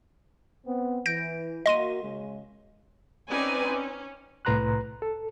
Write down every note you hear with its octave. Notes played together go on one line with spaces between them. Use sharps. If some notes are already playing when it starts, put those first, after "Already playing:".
B3 C4
E3 G6 A#6 D7
A#3 F#4 D#5 C6 D#7
C#3 G#3
C4 C#4 D#4 B4 D5 G#5
C#4
C2 A2 B4 A#5 C6 F#6
A4